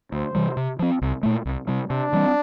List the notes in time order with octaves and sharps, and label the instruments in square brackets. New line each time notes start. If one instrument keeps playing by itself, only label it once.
[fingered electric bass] D2 [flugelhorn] C5
[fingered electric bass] C3 E3 G3
C3
F3 C4
C2
A#2 A3
C2
C3 G3
[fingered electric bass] C3 [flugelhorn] D4
[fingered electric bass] E3 G3 C4